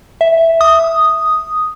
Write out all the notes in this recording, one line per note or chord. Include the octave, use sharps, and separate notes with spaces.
E5
D#6